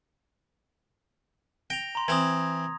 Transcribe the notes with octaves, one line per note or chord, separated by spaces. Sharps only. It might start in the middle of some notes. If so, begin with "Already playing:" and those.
G5 A#6 F7
A#5 C6
E3 C4 D#6 G#6